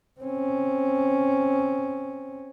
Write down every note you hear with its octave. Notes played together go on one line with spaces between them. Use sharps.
C4 C#4